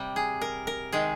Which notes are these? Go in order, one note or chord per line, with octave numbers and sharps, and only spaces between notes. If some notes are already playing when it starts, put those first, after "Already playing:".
Already playing: C3 G3
G#4
A#4
A#4
C3 D#3 G#3 G#4